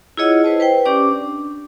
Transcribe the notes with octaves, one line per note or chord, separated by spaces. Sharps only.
E4 F4 G#4 C#5 D#5 F#5
E4 B4 C5 D#5 A5
B4 C5 G5
C#4 G4 D5 D6
D4